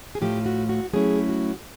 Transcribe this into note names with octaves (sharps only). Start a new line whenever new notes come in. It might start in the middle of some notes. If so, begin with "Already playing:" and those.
G#4
A2 F3 A3 G4
F#4
F#4
F#3 A3 C#4 E4 G#4
F#4